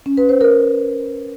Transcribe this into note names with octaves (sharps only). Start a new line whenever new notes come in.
C#4
B4
C5
A#4